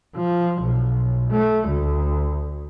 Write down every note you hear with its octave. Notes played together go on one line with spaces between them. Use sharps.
F3
B1
A3
D2